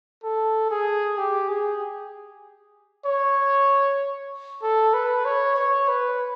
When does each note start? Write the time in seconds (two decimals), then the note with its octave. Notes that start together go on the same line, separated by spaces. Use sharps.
0.24 A4
0.71 G#4
1.18 G4
1.49 G#4
3.06 C#5
4.62 A4
4.94 B4
5.25 C#5
5.57 C#5
5.88 B4